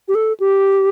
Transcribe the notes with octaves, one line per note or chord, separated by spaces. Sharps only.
G4
A4
G4